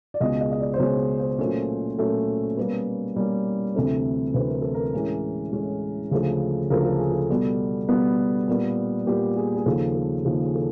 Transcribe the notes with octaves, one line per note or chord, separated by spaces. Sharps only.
D5
C#2 B2 G#3 D#5
D#5
D#5
D5
C5
C#2 B2 G#3 C#5
C5
A#2 F#3 A3 C#4
A#2 F#3 A3 C#4
B2 G3 A#3 C#4 B4
B2 G3 A#3 C#4
D2 C3 E3 A3 C4
D2 C3 E3 A3 C4 B4
A#4
A4
A#4
A2 E3 G#3 C#4
A2 E3 G#3 C#4
D2 C#3 F3 A3
D2 C#3 F3 A3 A#4
A4
G#4
A4
B2 G3 B3
B2 G3 B3
A#2 G3 B3
A#2 G3 B3 G4
G#4
G#4
D#2 C#3 F3 A4
A4
D#2 C#3 F3 G#4
G#4
A4